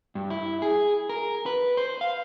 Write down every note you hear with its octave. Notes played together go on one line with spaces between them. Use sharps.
G2
E4
G#4
A#4
B4
C5
F5